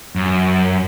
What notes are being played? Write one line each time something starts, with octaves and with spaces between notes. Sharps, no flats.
F#2